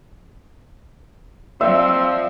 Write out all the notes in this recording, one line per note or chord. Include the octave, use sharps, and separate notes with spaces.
F3 C4 D5 E5 F5